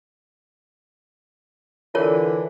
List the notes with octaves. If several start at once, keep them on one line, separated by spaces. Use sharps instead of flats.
D3 E3 F4 A#4 C#5